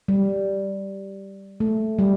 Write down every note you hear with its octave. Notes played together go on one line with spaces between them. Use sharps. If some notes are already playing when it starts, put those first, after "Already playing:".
G3
A3
G3